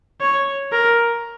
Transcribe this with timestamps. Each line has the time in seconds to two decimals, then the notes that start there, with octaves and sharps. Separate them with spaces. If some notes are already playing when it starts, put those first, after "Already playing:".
0.21 C#5
0.72 A#4